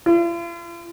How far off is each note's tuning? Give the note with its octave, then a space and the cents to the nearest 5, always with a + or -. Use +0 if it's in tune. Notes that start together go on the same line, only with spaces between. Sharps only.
F4 -45